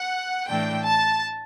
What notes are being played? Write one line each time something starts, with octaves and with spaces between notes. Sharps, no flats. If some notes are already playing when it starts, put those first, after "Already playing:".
Already playing: F#5
A2 E3 A3 D4 G5
A5